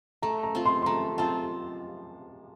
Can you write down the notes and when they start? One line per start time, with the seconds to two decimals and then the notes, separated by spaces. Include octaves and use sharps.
0.22 A3 A#5
0.43 A#5
0.55 C4 F4
0.65 C6
0.82 C6
0.86 A3 A#5
1.18 C4 F4 A5